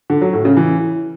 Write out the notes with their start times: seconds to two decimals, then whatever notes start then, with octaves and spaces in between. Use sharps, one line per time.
0.10 D3
0.21 F#3
0.33 A2
0.45 C#3
0.57 E3